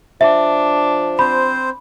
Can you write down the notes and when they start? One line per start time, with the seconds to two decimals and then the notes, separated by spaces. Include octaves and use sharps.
0.21 F3 D4 E5
1.19 C4 C5 B5